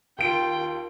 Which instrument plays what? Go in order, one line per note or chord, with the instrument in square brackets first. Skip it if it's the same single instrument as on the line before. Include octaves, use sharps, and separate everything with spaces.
[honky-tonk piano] D#2 D7 [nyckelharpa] F4 G5